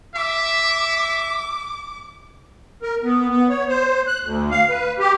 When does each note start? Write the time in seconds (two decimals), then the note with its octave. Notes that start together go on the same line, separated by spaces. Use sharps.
0.15 E5 D6
2.82 A#4
3.04 B3
3.29 B3
3.49 C#5
3.68 C5
4.07 F#6
4.23 D2
4.51 F5
4.69 B4
4.99 G4